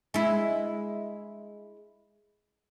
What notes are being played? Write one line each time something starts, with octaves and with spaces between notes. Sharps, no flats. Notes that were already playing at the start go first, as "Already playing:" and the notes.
G#3 E4